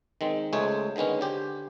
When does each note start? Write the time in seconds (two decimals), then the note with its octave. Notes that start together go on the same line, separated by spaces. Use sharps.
0.21 D#3 G#3 C4
0.53 C#2 G#3 A3 G#4 C5 C#5
0.96 D3 D#3 G#3 B3 C#4
1.21 D3 G4 C5